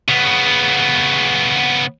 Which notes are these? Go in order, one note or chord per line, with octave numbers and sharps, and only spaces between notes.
C#3 B3